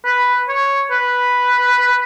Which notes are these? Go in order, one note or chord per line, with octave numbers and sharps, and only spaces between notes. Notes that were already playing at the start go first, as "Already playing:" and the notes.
B4
C#5
B4